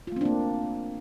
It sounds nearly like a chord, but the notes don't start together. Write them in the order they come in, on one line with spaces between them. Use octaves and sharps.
F4 A3 C4 D4 A#3